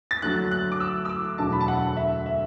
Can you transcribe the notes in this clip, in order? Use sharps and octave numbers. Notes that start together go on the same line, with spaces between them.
A6
D2 D3 F#3 F#6
F#6
D6
E6
E6
D6
E1 D2 D3 F#3 A5
B5
A5
F#5
E5
E5